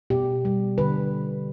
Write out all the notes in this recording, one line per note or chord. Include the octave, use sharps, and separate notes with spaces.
B2 G4
G3
D3 B4